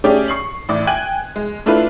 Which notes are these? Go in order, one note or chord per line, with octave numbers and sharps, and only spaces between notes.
A3 C#4 G4 G#4 C#5 D5
C#6 C7 F#7
A1 A2 D5 D6
G5 G#5 F#6 G#6 D#7 F#7
G#3
A3 D4 E4 F4 A4 B4